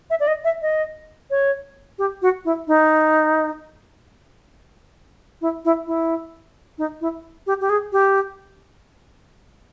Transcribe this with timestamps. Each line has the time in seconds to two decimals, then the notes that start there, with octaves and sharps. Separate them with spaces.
0.10 E5
0.20 D5
0.27 D#5
0.44 E5
0.62 D#5
1.30 C#5
1.98 G4
2.22 F#4
2.45 E4
2.67 D#4
5.41 E4
5.65 E4
5.87 E4
6.78 D#4
7.01 E4
7.47 G4
7.61 G4
7.69 G#4
7.92 G4